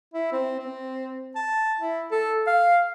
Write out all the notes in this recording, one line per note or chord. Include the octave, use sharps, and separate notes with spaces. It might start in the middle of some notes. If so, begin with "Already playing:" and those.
E4
C4
C4
A5
E4
A4
F5